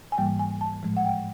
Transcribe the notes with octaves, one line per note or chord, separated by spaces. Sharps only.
G#5
G#2 E3 G3 A#3 G5
G#5
A5
A2 F3 G#3
F#5
G5